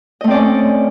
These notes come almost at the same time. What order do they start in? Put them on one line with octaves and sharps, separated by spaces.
D#5 A3 C4 D5 C#4